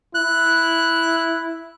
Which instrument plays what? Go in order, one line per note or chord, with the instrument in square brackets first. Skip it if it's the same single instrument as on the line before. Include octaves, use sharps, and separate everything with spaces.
[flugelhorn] E4 [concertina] F#6